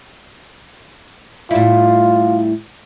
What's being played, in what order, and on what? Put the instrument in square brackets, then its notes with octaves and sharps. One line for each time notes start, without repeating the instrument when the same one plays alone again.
[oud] A2 G3 E4 [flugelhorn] F4